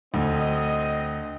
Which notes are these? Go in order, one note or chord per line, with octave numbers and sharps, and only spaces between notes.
D2 C4 D#5